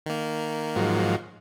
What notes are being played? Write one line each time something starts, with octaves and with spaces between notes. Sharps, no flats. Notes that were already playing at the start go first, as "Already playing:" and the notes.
D#3 A#3
G#2 F3 F#3